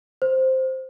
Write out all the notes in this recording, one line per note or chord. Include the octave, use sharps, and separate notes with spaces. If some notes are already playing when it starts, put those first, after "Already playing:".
C5